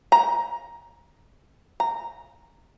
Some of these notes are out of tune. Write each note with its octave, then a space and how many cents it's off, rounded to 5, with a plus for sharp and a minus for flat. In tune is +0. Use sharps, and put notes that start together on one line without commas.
A#5 +10
A#5 -10